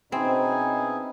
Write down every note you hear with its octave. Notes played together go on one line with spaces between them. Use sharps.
B2 C4 C#4 D#4 E4 G#4 G#5